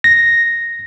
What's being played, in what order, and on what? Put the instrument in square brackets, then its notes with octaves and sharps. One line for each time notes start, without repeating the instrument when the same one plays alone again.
[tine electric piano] A#6